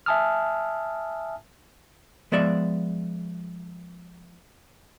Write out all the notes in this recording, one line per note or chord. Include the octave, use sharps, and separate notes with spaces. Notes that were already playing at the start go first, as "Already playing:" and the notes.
E5 G#5 A5 D#6 F6
F3 G#3 B3 D5 E5